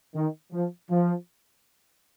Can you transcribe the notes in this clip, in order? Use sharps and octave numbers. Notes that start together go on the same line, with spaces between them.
D#3
F3
F3